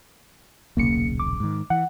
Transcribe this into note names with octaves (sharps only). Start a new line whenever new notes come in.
D#1 B1 C#3 A#3 C#7
D6
G#2 D#3
E3 F#5